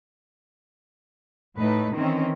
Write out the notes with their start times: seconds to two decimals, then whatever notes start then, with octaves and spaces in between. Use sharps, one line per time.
1.57 A2 D#4 B4
1.95 D#3 E3 C4 C#4